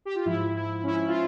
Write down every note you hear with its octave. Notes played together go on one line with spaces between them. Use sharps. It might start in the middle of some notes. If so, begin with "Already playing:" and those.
G4
F4
G#2 F3 E4
E4
C#4
E4
F4